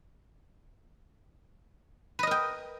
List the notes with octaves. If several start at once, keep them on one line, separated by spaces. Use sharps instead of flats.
A#4 B4 D#5 G5